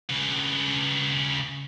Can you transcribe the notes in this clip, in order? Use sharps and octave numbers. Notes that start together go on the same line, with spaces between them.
C#3 B4